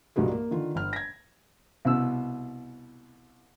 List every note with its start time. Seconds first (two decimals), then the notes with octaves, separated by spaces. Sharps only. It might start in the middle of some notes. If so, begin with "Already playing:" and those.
0.16 C2 G2 A#2 F#3 G#3
0.32 A#3
0.51 D3 D#3 F4
0.75 G1 F6
0.93 G#6 A#6
1.85 C2 B2 E6